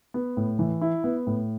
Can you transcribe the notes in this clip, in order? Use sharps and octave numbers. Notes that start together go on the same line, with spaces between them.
B3
A2
E3
E4
B3
A2